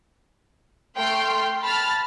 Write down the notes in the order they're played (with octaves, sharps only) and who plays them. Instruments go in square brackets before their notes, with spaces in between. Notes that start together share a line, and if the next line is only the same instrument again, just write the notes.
[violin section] A3 G5 C6 F6 C7
A5 B5 F6 A6